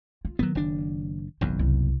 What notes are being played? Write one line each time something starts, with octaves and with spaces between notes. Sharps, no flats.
F4
D#3 F#3 B3
F#1 D4
F#1 B1 F#2 D#3
C2